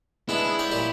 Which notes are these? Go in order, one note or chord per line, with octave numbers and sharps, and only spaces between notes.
G#3 B3 D4 E4
C#5 D5 G5
A#2 G3 G4